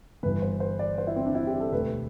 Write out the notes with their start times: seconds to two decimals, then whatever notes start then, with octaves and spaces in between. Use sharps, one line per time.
0.23 G1 G2 E3 B4
0.42 C5
0.60 C5
0.79 D5
0.98 C5
1.07 E4
1.16 C4
1.26 D4
1.35 E4
1.47 G4
1.60 A4
1.72 E1 D2 D3 A3 B4